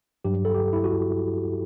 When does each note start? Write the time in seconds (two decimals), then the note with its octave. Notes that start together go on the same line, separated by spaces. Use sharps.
0.25 G2 F#3 G4
0.45 A4
0.55 G4
0.73 E4
0.84 F#4